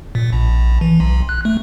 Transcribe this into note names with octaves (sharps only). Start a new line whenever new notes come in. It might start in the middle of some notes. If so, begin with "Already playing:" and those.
A#2
A#1
E3
B1
F#6
A3